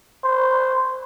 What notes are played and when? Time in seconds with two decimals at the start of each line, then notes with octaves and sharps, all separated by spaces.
0.24 C5